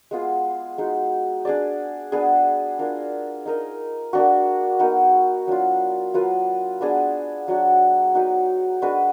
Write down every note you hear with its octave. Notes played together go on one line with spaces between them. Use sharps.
G#3 B3 F4 G#4
G#3 D#4 F#4
D4 G#4 D5
B3 D4 G#4
D4 F4 A#4
D#4 A#4 D#5
A#3 D4 F#4
B3 D#4 F#4 A#4
F#3 D4 F4
F#3 A#3 F4 B4
B3 D4 G#4
F#3 D4 F#4
D#4 F#4 B4
G#3 D4 F#4 B4